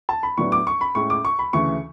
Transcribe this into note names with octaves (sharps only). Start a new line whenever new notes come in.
A5
B5
A2 F#3 B3 D4 C#6
D6
C#6
B5
A2 G#3 C#4 C#6
D6
C#6
B5
D2 C#3 E3 C#6